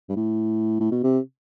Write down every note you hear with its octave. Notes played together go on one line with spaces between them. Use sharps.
G2
A2
A2
B2
C3